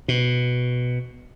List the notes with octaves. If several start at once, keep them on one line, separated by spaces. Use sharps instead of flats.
B2